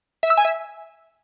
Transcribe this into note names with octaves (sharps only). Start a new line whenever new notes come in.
E5
E6
G#5
E5